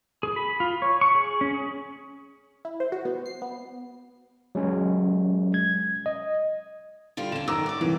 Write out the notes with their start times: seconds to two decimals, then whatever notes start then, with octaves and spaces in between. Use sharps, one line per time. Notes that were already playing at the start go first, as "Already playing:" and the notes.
0.23 G#4
0.36 B5
0.60 F4
0.82 C#5
1.01 C#6
1.15 G#4
1.41 C#4
1.54 G#4
2.65 E4
2.80 C5
2.92 F#4
3.05 B3
3.26 C7
3.42 B3
4.55 F#3 G#3 C#4
5.54 G#6
6.06 D#5
7.17 D3 G3 F4
7.32 D3 C#4 E7
7.48 F#2 D#3 A#5 D6 E6
7.66 F#2 D5
7.81 C2 F#2 E3